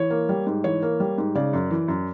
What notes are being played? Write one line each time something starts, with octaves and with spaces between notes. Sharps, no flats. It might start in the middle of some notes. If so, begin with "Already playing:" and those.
Already playing: E3 C#5
A#3
G3
G#2
E3 C#5
A#3
G3
G#2
C#3 D5
F#2
E3
F#2